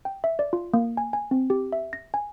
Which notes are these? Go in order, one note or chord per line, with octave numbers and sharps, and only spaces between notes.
G5
E5
D5
F4
A#3
G#5
G#5
C4
G4
E5
A#6
G#5